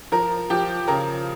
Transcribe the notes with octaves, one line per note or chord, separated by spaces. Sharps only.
F3 A#4
F3 G4
C#3 A#4